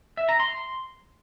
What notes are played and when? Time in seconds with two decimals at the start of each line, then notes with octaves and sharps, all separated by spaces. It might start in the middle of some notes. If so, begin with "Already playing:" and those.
0.17 E5
0.29 A#5
0.40 C6